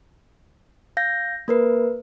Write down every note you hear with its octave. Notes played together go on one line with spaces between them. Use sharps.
F5 G6 A#6
A#3 A#4 B4